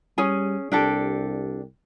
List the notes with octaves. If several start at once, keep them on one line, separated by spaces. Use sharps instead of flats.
G3 C#4 G#4 G#5
C2 D4 G4 A4